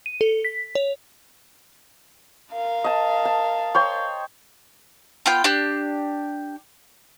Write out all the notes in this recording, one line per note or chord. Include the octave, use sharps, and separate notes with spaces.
D#7
A4
B6
C#5
A#4 F5
D#5 A5
A5
C#5 G5 C6
B3 F4 G5
D4 G4